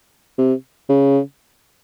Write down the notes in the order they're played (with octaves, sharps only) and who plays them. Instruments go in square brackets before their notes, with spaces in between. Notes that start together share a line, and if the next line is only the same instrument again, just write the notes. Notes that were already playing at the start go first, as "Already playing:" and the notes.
[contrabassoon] C3
C#3